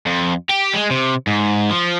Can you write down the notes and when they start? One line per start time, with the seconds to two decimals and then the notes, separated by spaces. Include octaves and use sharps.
0.06 F2
0.49 G4
0.73 G#3
0.91 C3
1.27 G#2
1.71 F3